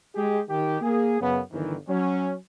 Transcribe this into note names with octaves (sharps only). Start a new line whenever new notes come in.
G#3 G4 G#4
D#3 G4
A#3 G#4
F#2 C#3 B3
G1 D#3 E3
F#3 C#4